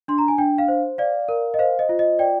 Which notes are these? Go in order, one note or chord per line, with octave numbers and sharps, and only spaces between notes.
D4 C6
A#5
G#5
D4 G5
F5
C5
D5 F5
A#4
D#5
C5 F5
D#5
F4
D#5
D5 G5